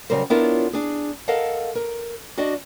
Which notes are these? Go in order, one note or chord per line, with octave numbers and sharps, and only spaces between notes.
C#3 F#3 G3 A#4 C5
B3 D4 E4 F4 A#4 C#5
D4 G#4
A4 A#4 D#5 F5 F#5 A5
A#4
D4 F#4 D5 D#5